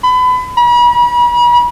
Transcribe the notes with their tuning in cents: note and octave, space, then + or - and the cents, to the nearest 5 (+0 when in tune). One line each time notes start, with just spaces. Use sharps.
B5 +30
B5 -40